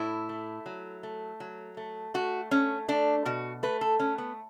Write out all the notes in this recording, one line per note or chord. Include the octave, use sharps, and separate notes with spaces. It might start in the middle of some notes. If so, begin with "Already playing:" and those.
Already playing: A2 E4
A3
F#3
A3
F#3
A3
A3 F#4
A3 C#4
A3 D4
B2 F#4
A3 B4
A4
A3 C#4
B3